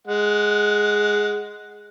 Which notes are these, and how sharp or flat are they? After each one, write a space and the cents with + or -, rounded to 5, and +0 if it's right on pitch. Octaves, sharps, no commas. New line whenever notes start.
G#3 +0 F#5 +0